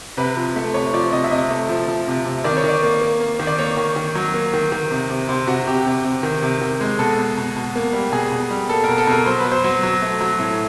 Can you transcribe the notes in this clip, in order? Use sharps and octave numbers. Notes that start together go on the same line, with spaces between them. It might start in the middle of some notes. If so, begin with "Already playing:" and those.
C3 B4
F3
A3
C3 C#5
F3 D5
C3 D#5
E5
C3 D#5
A3
F3
F3
C3
C3
D#3 D5
C#5
D#3
D5
A#3
A#3
A#3
D#3
D5
A#3 C#5
D#3
D#3
F#3
A#3
D#3
D#3
C3
C3
C3 C5
C3 F#4
C3 G4
C3
C3
D#3
C3
D#3
G#3
B2 A4
B2
B2
B2
A#3
G3
B2 G#4
B2
G3
A#3 A4
B2 A#4
A4
B2 A#4
F#3 C5
B4
F#3
C5
F#3
F#3
A3
F#3
A2